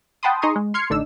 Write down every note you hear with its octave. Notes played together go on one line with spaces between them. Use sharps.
F#5 G5 A5 B5 C6 D#6
D#4 G#4 A#5 C6 C#6 D#6
G#3
C6 F6 G#6 C7 C#7
A1 D3 D4 D#4 E6